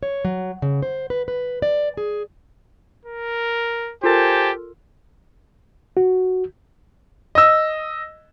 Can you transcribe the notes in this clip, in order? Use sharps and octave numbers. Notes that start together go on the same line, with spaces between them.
C#5
F#3
C#3
C5
B4
B4
D5
G#4
A#4
F4 G4 A4 A#4 C5 G#5 A5
F#4
D#5 E6